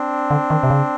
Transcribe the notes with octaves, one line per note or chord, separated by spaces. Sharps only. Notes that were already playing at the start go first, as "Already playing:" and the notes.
Already playing: C4 D4
D3
D#3
C3
C#3